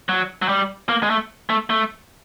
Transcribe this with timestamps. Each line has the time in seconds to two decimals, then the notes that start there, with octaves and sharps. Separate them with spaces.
0.09 F#3
0.42 F#3
0.49 G3
0.89 A#3
1.03 G#3
1.10 A3
1.50 A3
1.70 A3